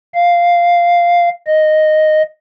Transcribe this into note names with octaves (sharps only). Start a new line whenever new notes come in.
F5
D#5